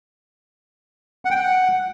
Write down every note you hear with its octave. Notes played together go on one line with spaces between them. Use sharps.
F#5
G5
F#5